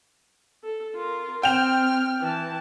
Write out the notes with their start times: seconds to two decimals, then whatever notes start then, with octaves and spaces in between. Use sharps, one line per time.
0.64 A4
0.96 F4 A#4
1.43 C4 G5 F6 E7 F7
2.21 E3 A5